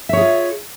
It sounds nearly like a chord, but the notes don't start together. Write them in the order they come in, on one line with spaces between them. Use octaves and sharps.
E5 C#5 G#4 F4